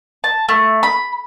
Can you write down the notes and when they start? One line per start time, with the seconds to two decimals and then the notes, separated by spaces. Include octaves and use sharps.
0.24 A5
0.49 A3
0.83 B5